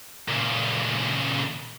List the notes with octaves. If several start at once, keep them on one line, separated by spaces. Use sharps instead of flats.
A#2 C#3